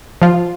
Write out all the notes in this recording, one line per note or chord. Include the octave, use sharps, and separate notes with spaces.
F3 F4